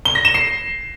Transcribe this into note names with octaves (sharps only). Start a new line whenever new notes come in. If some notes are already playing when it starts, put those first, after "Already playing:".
G7
A#6
E7
C7